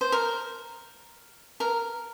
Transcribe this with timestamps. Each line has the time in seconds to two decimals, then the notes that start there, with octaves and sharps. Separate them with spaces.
0.01 C5
0.12 A#4
1.60 A#4